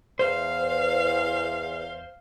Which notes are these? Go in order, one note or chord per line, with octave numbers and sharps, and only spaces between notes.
E2 C5 F5